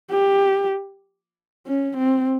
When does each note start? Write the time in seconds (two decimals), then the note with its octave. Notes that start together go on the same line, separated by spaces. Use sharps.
0.11 G4
1.67 C#4
1.97 C4